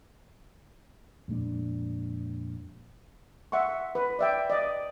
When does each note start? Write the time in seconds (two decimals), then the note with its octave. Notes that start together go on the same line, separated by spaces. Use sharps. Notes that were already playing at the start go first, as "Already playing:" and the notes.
1.28 F2 A#2 G#3 D4
3.52 E5 F#5 C6 C#6
3.95 B4
4.19 D5 E5 G5
4.50 D5 D#5